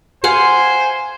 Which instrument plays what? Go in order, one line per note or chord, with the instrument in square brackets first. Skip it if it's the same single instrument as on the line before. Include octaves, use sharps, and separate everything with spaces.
[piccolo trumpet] C5 [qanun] F5 F#5 C6 [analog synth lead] G#5